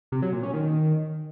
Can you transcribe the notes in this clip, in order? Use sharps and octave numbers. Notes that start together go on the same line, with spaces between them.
C3
F#3
A#2
C#4
D#3